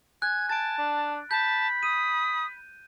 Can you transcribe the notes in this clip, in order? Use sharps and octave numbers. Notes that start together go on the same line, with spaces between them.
G#5 F#6 G#6
A5 A6 D7
D4
A5 B5 G6
D#6 D#7